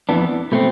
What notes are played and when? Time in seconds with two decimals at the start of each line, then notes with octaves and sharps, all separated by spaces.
0.09 F2 E3 B3 D4
0.52 B2 A3 C4